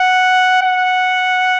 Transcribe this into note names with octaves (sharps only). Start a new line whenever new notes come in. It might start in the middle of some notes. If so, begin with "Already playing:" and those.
Already playing: F#5
F#5